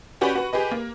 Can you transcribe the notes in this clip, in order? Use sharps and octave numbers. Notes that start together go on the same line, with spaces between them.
C#4 F#4 G4 B4 D5 B5
F#4 B4
G4 G#4 B4 D#5
A#3